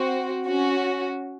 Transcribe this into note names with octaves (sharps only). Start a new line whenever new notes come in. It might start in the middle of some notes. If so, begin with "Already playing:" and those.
Already playing: C4 F#4
C#4 F#4